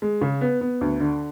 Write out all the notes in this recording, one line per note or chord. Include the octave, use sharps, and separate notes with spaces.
G#3
C#3
B3
B3
D2
D3